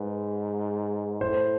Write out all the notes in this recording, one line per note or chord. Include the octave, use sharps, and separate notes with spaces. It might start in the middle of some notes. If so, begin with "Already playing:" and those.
Already playing: G#2 B4
A2 C5